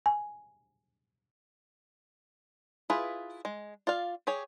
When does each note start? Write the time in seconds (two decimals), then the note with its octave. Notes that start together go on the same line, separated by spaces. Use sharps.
0.06 G#5
2.90 E4 F4 G#4 B4
3.45 G#3
3.87 F4 D5 F5
4.27 G4 G#4 C#5